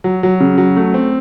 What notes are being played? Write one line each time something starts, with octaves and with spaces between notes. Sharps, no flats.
F#3
F#3
C#3
F#3
A3
C4